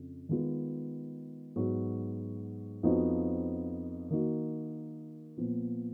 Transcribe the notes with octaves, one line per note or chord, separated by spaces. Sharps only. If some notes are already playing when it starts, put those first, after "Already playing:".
Already playing: F2 C#3
D#3 G#3 B3 F4
G#2 F#3 B3 F#4
F2 F3 B3 D#4 F#4
D#3 A#3 D#4 F#4
A#2 F3 B3